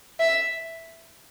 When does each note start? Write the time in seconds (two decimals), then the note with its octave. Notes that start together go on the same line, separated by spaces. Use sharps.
0.20 E5